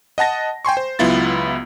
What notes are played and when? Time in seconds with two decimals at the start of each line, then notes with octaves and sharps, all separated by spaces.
0.18 D#5 F#5 A5 A#6
0.65 G5 G#5 C6 C#6
0.77 C5
0.99 C#2 F#3 B3 E4 F4 A6